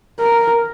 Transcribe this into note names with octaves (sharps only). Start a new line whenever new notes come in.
A#4